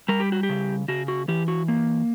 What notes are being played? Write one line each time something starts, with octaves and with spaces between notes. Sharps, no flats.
G3 A#4
G4
F#4
G4
C#3
C#3 F#4
F#4
E3 G4
F#4
A#3